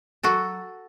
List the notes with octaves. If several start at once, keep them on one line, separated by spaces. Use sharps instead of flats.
F#3 F#4 A4